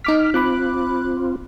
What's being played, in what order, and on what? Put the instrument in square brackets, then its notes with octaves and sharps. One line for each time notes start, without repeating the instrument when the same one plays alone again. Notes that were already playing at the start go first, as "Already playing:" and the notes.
[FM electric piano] D#4 D6 B6 [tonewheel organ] F6
[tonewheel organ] C4 F4 [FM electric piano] B5 D6 F#6